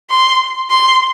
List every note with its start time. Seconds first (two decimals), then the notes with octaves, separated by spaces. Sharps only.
0.10 C6
0.70 C6